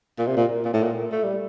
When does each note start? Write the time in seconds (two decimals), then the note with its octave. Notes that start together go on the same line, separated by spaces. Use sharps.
0.18 A#2
0.27 C3
0.37 A#2
0.65 A#2
0.73 A2
0.83 A#2
1.12 A3
1.23 G3